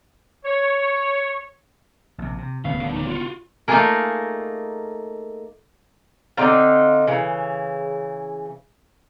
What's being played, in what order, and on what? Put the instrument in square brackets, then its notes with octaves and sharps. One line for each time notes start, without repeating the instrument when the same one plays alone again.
[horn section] C#5
[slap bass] A#1 C3
C3
[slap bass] D#1 D2 [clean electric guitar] C#3 B3 [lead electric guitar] F5
[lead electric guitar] D3
D#4 C#5
F4 F#4
[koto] A3 A#3 D#4 F4 G#4 A#4
[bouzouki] D3 C4 D#4 F5
C#3 E3